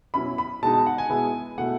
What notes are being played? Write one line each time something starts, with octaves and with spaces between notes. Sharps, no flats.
B2 F#3 C#4 E4 B5
B5
B2 G#3 D#4 A5
A5
F#5
G#5
B2 G#3 B3 E4
B2 A3 E4 F#5